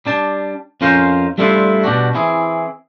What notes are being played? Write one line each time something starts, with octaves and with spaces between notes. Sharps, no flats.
G3 D4 A5
F2 C#4 F4 A#4 C5 F5
G3 A3 C4 D4 E4 F4
B2 G3 D4 F#4
E3 C4 E4 G#4